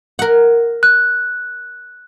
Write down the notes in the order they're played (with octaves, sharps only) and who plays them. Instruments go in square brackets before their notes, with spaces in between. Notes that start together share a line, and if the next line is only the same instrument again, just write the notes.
[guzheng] A#4 F#5
[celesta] F#6